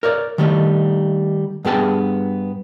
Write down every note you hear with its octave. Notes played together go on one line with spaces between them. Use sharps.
A#4 C#5 D5
D#3 G3 A3
G2 B3 G#4 G5 A5